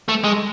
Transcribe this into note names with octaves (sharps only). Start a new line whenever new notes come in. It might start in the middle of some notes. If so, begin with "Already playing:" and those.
A3
G#3